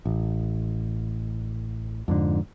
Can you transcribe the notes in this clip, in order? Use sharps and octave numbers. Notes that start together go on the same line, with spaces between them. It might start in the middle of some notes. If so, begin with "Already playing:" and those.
A1
F2 G#2 D3